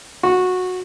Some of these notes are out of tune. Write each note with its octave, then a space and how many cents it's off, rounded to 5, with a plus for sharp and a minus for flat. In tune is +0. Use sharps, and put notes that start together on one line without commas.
F#4 -15